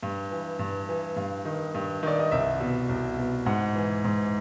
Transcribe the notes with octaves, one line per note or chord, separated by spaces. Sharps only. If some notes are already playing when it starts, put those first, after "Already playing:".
G2
E3
G2
E3
G2 F5
D#3
G2
D#3 D5
D#5
C2 E5
B2
C2
B2
G#2 F#5
E3
G#2